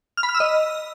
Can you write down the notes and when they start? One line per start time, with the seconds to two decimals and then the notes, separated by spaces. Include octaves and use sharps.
0.17 F6
0.23 B5
0.29 F6
0.34 E6
0.40 D#5